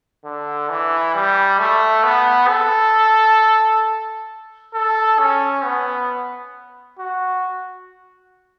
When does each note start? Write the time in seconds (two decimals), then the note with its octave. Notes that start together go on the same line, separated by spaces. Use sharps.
0.25 D3
0.70 E3
1.15 G3
1.59 A3
2.04 B3
2.49 A4
4.74 A4
5.19 C#4
5.64 B3
6.99 F#4